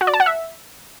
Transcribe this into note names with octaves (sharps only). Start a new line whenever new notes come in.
F#4
D5
A5
F#5
E5